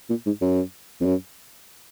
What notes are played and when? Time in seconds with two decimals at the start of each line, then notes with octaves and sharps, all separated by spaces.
0.09 A#2
0.26 G#2
0.41 F#2
1.01 F2
1.05 F#2